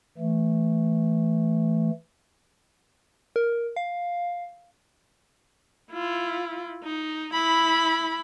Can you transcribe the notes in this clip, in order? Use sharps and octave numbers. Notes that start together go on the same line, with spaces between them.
E3 A3
A#4
F5
E4 F4
D#4
E4 B5